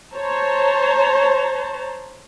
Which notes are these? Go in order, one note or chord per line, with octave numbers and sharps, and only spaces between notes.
C5 C#5 A5 A#5